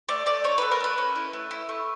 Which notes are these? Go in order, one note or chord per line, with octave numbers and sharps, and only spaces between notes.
A3 D5
A3 D5
D#4 C#5
A3 B4
A#4
A3 B4
C#4
E4
A3
E4
A3